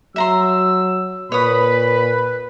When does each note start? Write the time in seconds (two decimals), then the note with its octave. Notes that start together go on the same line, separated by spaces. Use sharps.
0.16 F#3 E5 A#5 C6 E6
1.32 A#2 B4 C#5 B5 D#6